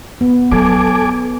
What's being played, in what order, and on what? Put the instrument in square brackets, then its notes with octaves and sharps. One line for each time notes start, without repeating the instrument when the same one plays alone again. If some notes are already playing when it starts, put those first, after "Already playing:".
[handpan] B3
[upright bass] F#3 [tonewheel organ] A4 G#5 D6